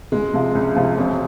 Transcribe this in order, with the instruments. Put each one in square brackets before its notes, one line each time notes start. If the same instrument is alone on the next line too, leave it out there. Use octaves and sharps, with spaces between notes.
[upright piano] C#2 [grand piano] G#3
[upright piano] C3 F3
C#2
C3 F3
[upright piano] E1 [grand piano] C4